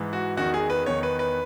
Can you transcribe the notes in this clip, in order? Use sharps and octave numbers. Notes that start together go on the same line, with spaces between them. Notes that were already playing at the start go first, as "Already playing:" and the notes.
Already playing: G#2 E3
F#4
E2 D#3 F#4
G#4
B4
E2 D#3 C#5
B4
B4